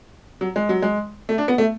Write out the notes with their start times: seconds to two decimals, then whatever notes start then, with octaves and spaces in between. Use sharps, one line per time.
0.41 F#3
0.56 G#3
0.69 F#3
0.82 G#3
1.29 A3
1.38 D4
1.48 B3
1.58 A3